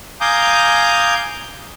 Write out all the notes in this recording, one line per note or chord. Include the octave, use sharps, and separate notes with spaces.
F5 G#5 A#5 D6 D#6 G6